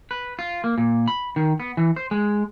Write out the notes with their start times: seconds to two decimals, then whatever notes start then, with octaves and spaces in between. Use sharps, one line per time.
0.11 B4
0.39 F4
0.64 A#3
0.78 A#2
1.08 B5
1.36 D#3
1.60 B3
1.77 E3
1.96 C5
2.11 G#3